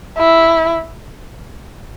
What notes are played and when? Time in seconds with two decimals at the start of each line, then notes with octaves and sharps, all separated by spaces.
0.18 E4